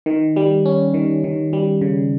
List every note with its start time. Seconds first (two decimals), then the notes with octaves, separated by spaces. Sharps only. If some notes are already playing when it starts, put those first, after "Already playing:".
0.06 D#3
0.36 G3
0.66 C#4
0.94 D#3
1.24 D#3
1.53 G3
1.81 C#3